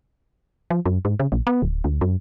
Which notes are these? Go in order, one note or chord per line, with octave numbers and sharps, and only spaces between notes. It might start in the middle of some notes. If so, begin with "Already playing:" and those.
F3
F#2
G#2
C#3
A#1
B3
D1
D2
F#2